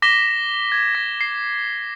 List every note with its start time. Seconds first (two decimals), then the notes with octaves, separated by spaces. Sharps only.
0.02 D6 A#6 B6 E7 G7
0.72 G#6
0.95 A#6
1.21 C7